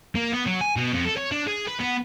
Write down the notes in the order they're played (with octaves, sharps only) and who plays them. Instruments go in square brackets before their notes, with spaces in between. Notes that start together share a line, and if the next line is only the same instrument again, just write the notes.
[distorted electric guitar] A#3
B3
F#3
G#5
B2
F2
A4
C#5
D4
G#4
B4
B3